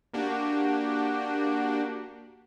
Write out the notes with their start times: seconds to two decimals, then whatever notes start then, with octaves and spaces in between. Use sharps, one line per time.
0.13 A#3 D4 F#4 G4